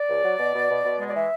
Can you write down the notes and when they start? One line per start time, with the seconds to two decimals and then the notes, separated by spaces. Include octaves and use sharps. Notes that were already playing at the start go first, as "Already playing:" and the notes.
Already playing: D5
0.08 C#2
0.23 F#3
0.39 B2
0.54 B2
0.69 B2
0.84 B2
1.00 G#3
1.08 D5
1.15 E3 E5